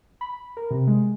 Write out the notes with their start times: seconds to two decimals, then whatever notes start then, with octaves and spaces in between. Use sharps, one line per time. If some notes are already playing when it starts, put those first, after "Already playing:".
0.21 B5
0.57 A#4
0.71 C3
0.87 G#3